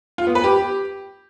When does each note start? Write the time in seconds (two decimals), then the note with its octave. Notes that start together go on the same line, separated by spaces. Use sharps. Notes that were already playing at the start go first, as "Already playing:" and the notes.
0.18 F4
0.27 B3
0.35 B4
0.44 G4